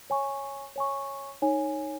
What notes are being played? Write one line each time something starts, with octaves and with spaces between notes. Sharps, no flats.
C#5 G#5 C#6
C#5 G#5 C#6
D#4 C#5 G#5